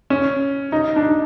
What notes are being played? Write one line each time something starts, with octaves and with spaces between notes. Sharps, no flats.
C#4
D#4
D4
D#4